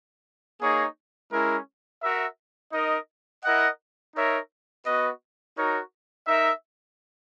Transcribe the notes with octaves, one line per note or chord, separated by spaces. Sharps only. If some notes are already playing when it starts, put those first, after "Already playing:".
A#3 D#4 G#4 C#5
G#3 C#4 E4 A#4
F#4 A#4 E5
D#4 A#4 D#5
E4 A#4 D#5 F#5
D#4 A#4 C#5 E5
B3 F#4 B4 D#5
D#4 F#4 A#4 C#5
D#4 A#4 E5